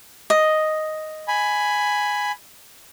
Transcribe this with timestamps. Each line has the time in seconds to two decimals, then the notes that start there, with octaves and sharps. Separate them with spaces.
0.30 D#5
1.28 G#5 B5